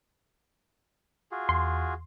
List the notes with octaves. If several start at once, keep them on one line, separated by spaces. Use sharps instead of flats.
F4 F#4 G#4
E2 C6